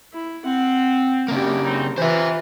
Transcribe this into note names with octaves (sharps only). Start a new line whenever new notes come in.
E4
C4 F#5
C#3 A#3 D4 G4
C4 D#4
E3 F4 B4 C5 E5